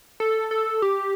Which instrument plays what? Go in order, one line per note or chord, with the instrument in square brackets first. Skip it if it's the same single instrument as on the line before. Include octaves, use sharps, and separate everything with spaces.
[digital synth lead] A4
A4
G4